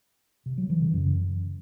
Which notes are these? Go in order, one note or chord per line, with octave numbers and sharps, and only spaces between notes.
C3
F#3
E3
C#3
F#2